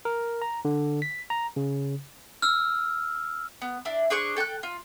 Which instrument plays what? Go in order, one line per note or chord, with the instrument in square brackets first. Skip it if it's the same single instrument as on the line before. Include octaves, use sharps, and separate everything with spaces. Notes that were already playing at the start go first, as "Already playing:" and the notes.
[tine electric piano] A#4
A#5
D3
B6
A#5
C#3
[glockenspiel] E6 F6
[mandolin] B3
D4 E4
D4 G#4 C5 C#6
A4 G5 A5 F#6
F4